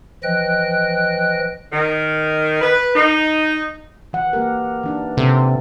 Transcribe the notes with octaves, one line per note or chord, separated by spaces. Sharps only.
E3 F3 D#5 G5 F#6
D#3
B4
D#4
E3 F#5
A#3 G4 A#4
E3 D4 D#4
C3 A4